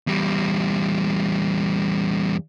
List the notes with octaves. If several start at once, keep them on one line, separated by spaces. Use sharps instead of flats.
E2 G3